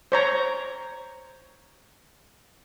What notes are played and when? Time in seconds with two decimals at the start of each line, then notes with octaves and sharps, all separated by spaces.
0.12 C5 C#5 A#5